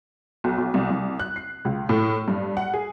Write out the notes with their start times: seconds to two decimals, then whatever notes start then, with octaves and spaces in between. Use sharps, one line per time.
0.44 B1
0.58 B1
0.74 C2
0.90 C2
1.19 F#6
1.36 C7
1.65 C#2
1.89 A2
2.28 G2
2.57 F#5
2.74 G#4